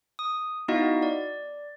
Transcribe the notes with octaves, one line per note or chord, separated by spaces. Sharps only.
D#6
B3 D#4 E4 F#4 D#5 F5
D5